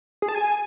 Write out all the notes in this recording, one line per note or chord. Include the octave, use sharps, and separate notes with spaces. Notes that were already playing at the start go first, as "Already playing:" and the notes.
G#4
A5
G#5